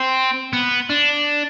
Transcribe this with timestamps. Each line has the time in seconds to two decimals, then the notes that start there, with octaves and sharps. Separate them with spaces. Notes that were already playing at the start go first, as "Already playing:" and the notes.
Already playing: C4
0.53 B3
0.89 D4